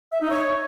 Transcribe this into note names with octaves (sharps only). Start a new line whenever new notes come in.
E5
D#4
C#5